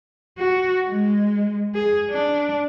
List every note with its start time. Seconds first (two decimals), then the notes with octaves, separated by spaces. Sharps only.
0.38 F#4
0.88 G#3
1.75 G#4
2.11 D4